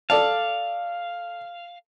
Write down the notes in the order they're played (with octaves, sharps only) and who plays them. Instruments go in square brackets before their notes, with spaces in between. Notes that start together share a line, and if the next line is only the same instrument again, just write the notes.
[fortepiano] A4 D5 A5 [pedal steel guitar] F5